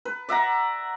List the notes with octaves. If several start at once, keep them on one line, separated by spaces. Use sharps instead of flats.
B4
D5 E5 F#5 A#5